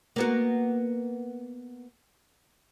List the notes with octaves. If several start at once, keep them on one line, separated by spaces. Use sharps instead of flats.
A#3 B3 F#4